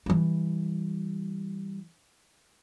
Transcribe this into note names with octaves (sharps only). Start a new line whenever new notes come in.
E3 G3